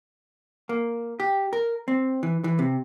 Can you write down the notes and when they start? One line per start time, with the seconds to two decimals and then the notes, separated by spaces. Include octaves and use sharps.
0.69 A#3
1.20 G4
1.53 A#4
1.88 C4
2.23 E3
2.44 E3
2.59 C3